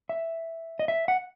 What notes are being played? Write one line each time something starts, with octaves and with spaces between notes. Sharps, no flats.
E5
D#5
E5
F#5